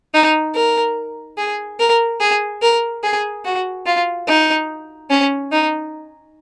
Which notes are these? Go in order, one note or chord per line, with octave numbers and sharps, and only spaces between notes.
D#4
A#4
G#4
A#4
G#4
A#4
G#4
F#4
F4
D#4
C#4
D#4